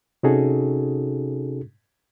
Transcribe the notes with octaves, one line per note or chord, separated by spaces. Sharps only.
C3 C#4 D#4 F#4 G#4 A4